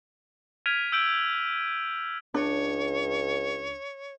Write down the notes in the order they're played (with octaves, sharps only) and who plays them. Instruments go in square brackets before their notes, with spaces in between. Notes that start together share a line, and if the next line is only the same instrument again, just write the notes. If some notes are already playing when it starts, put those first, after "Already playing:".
[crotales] F6 G#6 B6 D7 D#7 F7
E6 G6 D7 F#7
[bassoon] C#2 [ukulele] D4 [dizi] C#5